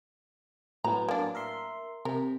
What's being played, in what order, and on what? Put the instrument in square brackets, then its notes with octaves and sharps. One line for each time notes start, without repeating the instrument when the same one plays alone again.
[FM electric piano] A2 F#3 B3 [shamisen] A#5
[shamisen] A#3 D4
[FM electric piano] A#4 E5 C6
[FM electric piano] C3 [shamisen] A#4